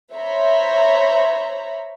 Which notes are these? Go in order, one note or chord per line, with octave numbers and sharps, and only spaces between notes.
C5 C#5 E5 A#5 B5